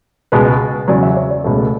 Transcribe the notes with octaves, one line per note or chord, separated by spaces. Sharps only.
C#2 B2 G#3 B4
E2 C#3 F#3 D5
E5
C#5
D5
C#2 B2 A3